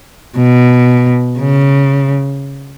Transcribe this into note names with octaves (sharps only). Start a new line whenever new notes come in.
B2
C#3